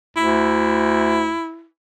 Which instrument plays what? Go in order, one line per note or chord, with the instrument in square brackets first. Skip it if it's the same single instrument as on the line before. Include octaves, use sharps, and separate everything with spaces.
[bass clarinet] D2 [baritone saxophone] E4